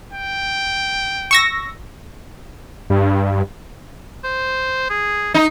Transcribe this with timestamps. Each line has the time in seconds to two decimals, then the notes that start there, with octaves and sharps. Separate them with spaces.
0.13 G5
1.31 C#6 E6 A#6
2.90 G2
4.24 C5
4.90 G#4
5.34 D#4 A#5